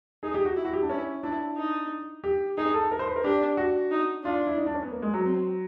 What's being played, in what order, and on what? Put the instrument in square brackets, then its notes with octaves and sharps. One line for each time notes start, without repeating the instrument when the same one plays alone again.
[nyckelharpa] D#4 [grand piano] G#4
[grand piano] G4
F#4
[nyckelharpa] E4
[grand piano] F#4
G4
D4
[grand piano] C#4 [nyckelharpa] E4
[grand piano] D4 [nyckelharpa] E4
[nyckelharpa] D#4
[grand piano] G4
[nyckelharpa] D#4 [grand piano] G#4
[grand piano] A4
A#4
C5
B4
A#4
[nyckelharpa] D4 [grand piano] G4
[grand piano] F#4
[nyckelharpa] D#4
[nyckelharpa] D4 [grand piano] F4
[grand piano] E4
D#4
D4
C#4
B3
A#3
G#3
F#3
[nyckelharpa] C4